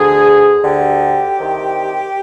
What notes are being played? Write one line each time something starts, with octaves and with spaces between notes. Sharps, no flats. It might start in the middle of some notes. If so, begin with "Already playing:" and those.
Already playing: D2 D3 G#4
D2 D3 G4
C2 C3 D#3